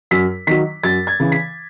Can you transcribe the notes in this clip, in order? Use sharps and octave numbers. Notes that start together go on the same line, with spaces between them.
F#2 B6
D#3 F#3 B6
F#2 A6
G#6
C#3 E3
B6